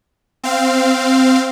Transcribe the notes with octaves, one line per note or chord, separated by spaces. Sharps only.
C4 F5